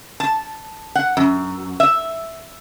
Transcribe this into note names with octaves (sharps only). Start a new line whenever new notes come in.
A5
F#5
F#2
E5